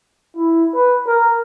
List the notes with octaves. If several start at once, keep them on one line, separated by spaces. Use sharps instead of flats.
E4
B4
A#4